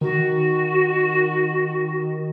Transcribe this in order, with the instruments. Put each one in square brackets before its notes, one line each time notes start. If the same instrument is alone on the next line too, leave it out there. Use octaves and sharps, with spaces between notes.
[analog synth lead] D#3 [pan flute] F#4